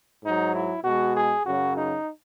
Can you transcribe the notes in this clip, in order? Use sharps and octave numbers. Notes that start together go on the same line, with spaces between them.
G#2 D#4
F#3
E4
B2 G#3 F#4
G#4
F#2 C#3 F#3 F#4
D#4